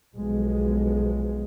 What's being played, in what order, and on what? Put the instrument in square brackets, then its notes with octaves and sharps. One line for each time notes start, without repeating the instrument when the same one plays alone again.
[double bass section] B1 F3 G#3